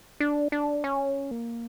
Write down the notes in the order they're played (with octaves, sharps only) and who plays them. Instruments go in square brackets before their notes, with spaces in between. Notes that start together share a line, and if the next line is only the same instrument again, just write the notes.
[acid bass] D4
D4
C#4
A#3